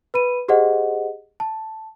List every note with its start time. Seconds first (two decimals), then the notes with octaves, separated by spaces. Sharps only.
0.14 B4 B5 D#7
0.48 G4 G#4 C5 D#5 F#5
1.40 A5